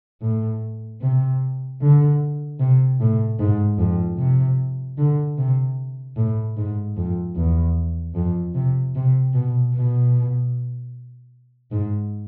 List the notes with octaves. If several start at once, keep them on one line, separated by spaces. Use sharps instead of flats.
A2
C3
D3
C3
A2
G#2
F2
C3
D3
C3
A2
G#2
F2
E2
F2
C3
C3
B2
B2
G#2